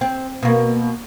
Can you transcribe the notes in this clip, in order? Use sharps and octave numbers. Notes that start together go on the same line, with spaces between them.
C4
B2 A#3